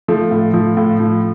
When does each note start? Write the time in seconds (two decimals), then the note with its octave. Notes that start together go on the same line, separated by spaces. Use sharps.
0.08 F3 A3
0.31 A2
0.54 F3
0.77 A2
1.00 F3